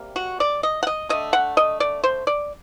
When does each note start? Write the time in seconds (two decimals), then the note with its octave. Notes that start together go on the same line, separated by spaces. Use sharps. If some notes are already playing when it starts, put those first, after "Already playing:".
Already playing: C3 G3 A#3
0.16 F#4
0.40 D5
0.63 D#5
0.83 F#5
0.87 D#5
1.09 D3 A3 D#5
1.33 F#5
1.57 D#5
1.80 D5
2.04 C5
2.27 D5